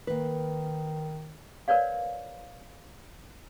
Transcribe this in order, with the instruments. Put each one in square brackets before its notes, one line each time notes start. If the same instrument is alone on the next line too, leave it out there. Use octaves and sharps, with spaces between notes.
[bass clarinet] D#3 [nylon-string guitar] A#3 B4
[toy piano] A#4 B4 C#5 D5 F5